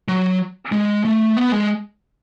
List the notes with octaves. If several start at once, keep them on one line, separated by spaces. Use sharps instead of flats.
F#3
G#3
A3
B3
G#3